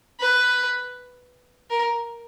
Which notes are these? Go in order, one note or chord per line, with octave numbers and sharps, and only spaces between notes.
B4
A#4